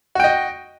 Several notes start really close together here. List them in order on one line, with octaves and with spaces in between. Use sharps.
F#4 G5 D#5